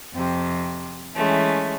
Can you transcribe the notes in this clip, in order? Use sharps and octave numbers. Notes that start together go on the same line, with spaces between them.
F2 C3
E3 G#3 A3 C#4